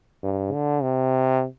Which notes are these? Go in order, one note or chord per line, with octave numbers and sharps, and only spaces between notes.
G2
D3
C3